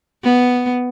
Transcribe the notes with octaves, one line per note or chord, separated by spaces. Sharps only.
B3